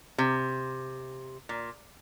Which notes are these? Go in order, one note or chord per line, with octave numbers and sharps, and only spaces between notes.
C3
A#2